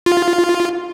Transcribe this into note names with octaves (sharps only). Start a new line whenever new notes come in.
F4